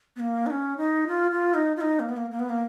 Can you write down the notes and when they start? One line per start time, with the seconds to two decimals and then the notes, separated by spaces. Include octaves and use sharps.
0.16 B3
0.20 A#3
0.46 D#4
0.50 C#4
0.77 D#4
1.07 F4
1.31 F4
1.54 D#4
1.76 F4
1.81 D#4
2.00 A#3
2.09 B3
2.17 A#3
2.31 A#3
2.39 B3
2.49 A#3